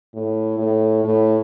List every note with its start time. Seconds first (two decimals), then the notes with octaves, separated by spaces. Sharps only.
0.14 A2
0.59 A2
1.04 A2